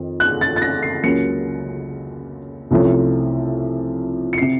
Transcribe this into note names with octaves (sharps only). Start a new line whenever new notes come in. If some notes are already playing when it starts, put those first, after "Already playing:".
Already playing: F2 D#3
F#6
A6
A6
A#6
C7
C#2 C#3 F#3 A#3 C#4 C#7
C2 C3 F3 A3 C#4
C#7
C3 C7